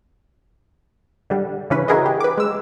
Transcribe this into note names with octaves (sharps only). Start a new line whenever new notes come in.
D3 G3 D4
C#3 E3 C#4 D4 B4
E4 F#4 G#4 A#4 B4 D#5
G4
B4 D6
G#3 E6